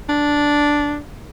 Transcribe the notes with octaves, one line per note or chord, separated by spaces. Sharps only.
D4